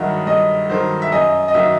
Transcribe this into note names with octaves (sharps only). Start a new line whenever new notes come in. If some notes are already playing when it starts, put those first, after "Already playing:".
Already playing: G2 D#3 F#3 D#5 E5 F#5
G2 D#5
D#3 F#3 C5
E5
F#2 D#5
D#5
D#3 F#3 E5